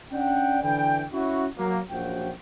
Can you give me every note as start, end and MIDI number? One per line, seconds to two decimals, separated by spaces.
0.12 0.61 61
0.12 0.61 62
0.12 0.61 74
0.12 0.61 78
0.12 0.61 79
0.62 1.03 50
0.62 1.03 52
0.62 1.03 79
1.13 1.46 61
1.13 1.46 64
1.13 1.46 66
1.57 1.79 54
1.57 1.79 58
1.90 2.29 34
1.90 2.29 42
1.90 2.29 53
1.90 2.29 66
1.90 2.29 79